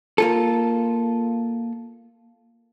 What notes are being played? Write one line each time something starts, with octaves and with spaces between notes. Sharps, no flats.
A#3 F4 A4